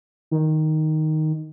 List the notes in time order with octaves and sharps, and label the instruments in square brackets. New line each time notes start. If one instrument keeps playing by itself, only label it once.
[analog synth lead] D#3